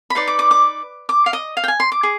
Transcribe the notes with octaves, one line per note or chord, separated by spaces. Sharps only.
B5
D#4 B4 D5 C6
D6
D6
D6
D6
F5
D#5
F5
G5
G#5
C6
D6
G#4